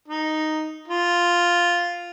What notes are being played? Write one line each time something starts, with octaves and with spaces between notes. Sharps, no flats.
D#4
F4